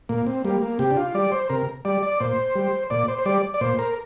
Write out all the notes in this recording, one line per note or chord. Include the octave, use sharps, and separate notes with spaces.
A#2 A#3
C4
G3 A#3
A#3
C3 G4
D4
F4
G3 D5
C5
C3 A#4
G3 D5
D5
A#2 C5
G3
A#2 D5
C5
C5
G3 D5
D5
A#2 C5
A#4